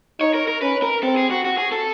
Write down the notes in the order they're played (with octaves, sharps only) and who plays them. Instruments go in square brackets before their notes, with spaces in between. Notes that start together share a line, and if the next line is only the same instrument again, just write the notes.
[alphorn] D#4 [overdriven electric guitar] C#5
[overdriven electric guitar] A#4
A#4
[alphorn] C#4 [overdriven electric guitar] B4
[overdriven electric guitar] A#4
[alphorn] C4 [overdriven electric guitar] A4
[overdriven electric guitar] G#4
F#4
F#4
G#4
A4